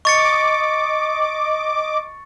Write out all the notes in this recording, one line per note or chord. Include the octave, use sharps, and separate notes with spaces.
D#5 C#6 D6 A6 C#7